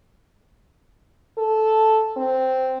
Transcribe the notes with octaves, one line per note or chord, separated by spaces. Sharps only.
A4
C4